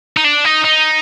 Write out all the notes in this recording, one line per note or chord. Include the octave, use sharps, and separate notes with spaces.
D#4
D4
D#4
D#4